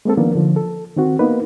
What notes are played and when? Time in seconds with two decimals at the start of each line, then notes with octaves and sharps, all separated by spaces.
0.05 G#3 A#3 C4 A4
0.17 D#3 F3 A#3 B3 D4
0.35 D3 F3
0.56 A4
0.97 D#3 C4 F#4
1.19 A#3 B3 D#4 B4